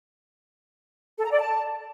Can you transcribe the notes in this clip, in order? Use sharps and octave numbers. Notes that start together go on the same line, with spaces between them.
A4
A#5
D5
A5